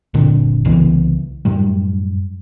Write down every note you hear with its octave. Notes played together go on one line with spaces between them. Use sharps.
F#1 A#2 D3 C4
C2 C#3 E3 B3
F#2 A2 G3